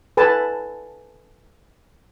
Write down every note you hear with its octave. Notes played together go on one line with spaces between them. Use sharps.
A4 B4 G#5 A5